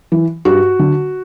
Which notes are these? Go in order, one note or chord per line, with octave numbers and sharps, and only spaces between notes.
E3
G2 F#4
D3